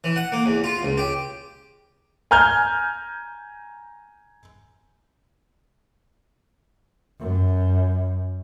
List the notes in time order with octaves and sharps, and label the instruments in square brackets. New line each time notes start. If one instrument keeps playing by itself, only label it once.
[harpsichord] E3
F#5
A#3
E2
F4
C#2
G4
[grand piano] G#5 A#5 F6 G6 G#6
[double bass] F#2